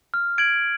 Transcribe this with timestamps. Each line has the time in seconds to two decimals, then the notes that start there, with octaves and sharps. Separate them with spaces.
0.14 F6
0.38 G#6 D7 F#7